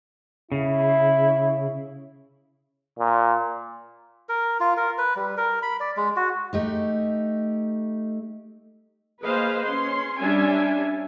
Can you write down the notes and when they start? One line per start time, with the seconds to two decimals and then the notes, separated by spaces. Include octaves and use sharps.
0.52 C#3 E4
2.99 A#2
4.29 A#4
4.60 F4
4.77 A#4
4.98 B4
5.16 G3
5.37 A#4
5.62 B5
5.80 D5
5.97 G#3
6.16 F#4
6.53 A3 D#4 G4
9.23 A#3 G#4 B4 C5 D#5 F5
9.65 C#4 C6
10.19 G3 C#4 D4 E5 G#5